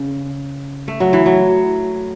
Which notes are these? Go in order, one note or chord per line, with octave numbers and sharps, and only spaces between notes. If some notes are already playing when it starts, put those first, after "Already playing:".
Already playing: C#3
A3
F#3
E3
F#3